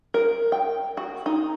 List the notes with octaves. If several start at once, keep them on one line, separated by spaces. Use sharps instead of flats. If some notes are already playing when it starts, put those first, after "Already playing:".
A#4
G5
F#4
D#4